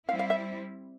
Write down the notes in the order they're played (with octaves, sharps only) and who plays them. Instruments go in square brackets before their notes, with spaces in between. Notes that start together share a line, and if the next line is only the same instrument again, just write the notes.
[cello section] G3 C4 E4 [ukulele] F5
[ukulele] F5
E5